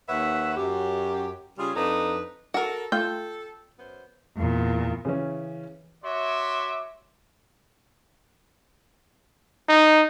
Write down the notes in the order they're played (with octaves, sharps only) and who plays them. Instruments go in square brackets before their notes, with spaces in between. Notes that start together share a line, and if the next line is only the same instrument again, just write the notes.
[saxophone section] D#2 B4 C#5 E5 F#5
F#2 G4
C#3 G3 F4 G#4
F2 F3 D4 D#4 A4 B4
[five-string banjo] F#4 A#4 [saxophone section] A4
[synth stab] A3 F4 G6 [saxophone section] A4 [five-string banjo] G5
[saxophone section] F#2 B3 C5
[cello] E2 A#2
[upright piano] C#3 E3 C#4
[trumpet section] F#4 C#5 E5 C6 D6
[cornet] D#4